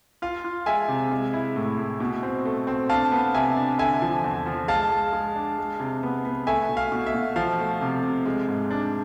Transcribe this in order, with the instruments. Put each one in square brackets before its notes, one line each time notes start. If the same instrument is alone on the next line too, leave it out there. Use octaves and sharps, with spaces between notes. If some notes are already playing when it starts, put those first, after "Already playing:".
[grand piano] F4 F5
F4
G#3 E5 G#5
C3
G#3
E4
A2
A2
B2
C4
A3
C4
D4 F5 A5
B3
C3 E5 G#5
D4
D3 E5 G#5
F3
E2
F3
G#3 F5 A5
G#3
G#3
D4
G#3
C3
B3
B3
A3 E5 G#5
B2
F5
B2
E5
B2
F3 F5
A3
C3
C3
G#3
G#2
D4